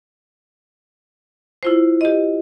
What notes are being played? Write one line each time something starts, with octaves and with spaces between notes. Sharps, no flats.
E4 F4 C5
G4 D#5